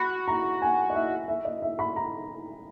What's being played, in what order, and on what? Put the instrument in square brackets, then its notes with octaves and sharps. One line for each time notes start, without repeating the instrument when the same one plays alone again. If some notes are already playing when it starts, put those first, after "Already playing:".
Already playing: [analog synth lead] F#4 [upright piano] B5
[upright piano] A#5
G#5
D#5
E5
E5
D#5
E5
B5
A#5